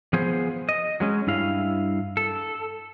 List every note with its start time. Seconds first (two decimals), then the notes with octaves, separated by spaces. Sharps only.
0.13 F3 B3 G#4 C5
0.69 D#5
1.00 F#3 G#3 C#4
1.27 G2 E4 F5
2.17 A4